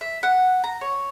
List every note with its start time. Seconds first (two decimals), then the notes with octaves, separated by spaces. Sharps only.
0.01 E5
0.23 F#5
0.64 A#5
0.81 C#5